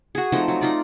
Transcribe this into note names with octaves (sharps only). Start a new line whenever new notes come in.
F#4 G#4
F3 A3 C4 D#4
F#3
D#4 F4 D5